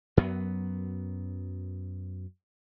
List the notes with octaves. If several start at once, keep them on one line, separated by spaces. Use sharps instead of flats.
F#2 F#3 B3